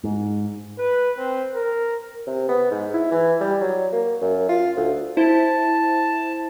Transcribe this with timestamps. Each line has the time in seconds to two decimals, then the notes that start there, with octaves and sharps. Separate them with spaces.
0.04 G#2
0.78 B4
1.18 C4
1.55 A#4
2.27 C3
2.49 B3
2.71 G#2
2.93 E4
3.11 E3
3.41 G3
3.61 F#3
3.92 A#3
4.21 F#2
4.49 F4
4.77 D2
5.17 E4 C5 A5